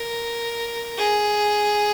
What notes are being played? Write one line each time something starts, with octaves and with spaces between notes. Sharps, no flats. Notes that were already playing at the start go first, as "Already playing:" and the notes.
Already playing: A#4
G#4